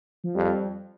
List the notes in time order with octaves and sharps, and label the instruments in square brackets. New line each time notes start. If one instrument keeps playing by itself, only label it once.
[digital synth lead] F3
[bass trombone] F2 [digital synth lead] G3